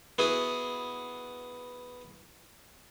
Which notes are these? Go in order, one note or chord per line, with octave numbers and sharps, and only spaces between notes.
B3 E4 F#4 G#4